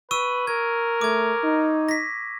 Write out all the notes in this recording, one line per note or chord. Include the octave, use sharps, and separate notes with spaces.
B4 C#6 E6 D#7
A#4 G#6
A3 D6 G#6
D#4
A#6 B6